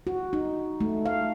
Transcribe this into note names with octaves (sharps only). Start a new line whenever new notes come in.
F#4
D#4
A3
F5